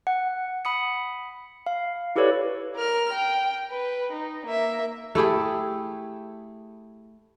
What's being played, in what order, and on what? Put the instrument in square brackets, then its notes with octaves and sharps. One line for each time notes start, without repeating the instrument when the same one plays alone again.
[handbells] F#5
B5 D#6 C#7
F5
E4 G4 A4 B4 C#5 D5
[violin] A#4 F6
G5
B4
D#4
A#3 E5
[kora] A3 E4 G4 G#4